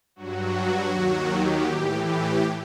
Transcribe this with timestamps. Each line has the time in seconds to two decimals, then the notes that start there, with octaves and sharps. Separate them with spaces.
0.16 G2 F#3 F#4
0.91 D#2 D#3 F#3
1.28 G4
1.66 A2 E3
2.04 G4